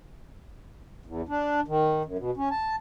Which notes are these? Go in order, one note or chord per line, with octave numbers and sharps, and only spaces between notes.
E2
D4
D#3
F#2
B2
C#4
A5